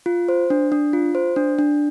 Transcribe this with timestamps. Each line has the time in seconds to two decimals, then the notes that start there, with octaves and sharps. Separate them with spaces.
0.06 F4
0.29 C5
0.50 D4
0.72 D4
0.93 F4
1.15 C5
1.36 D4
1.59 D4